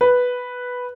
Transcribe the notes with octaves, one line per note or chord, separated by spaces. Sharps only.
B4